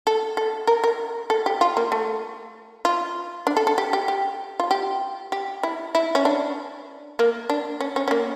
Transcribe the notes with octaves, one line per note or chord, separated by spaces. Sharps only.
A4
A4
A#4
A#4
A4
G4
F4
A#3
A3
F4
D4
A4
A4
G4
G4
G4
F4
G4
G4
E4
E4
C#4
D4
A#3
D4
C#4
C#4
C#4
A#3